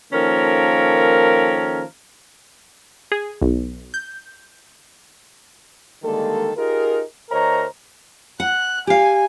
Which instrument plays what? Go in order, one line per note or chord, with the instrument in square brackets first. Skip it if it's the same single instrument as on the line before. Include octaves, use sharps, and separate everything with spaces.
[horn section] D#3 F3 A#3 C#4 A4 A#4
[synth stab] G#4
B1
G6
[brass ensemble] D3 D#3 G3 G#3 A#3 A4
D#4 F4 G4 G#4 A#4
D2 A#4 C5 C#5 D#5 A#5
[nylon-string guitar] F#5 [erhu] F#6
[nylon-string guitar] G4 F5 [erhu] G#5